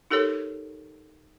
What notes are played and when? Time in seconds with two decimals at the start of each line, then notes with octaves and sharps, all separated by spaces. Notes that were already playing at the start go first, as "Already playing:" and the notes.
0.11 D#4 G4 A4 A#4 C#5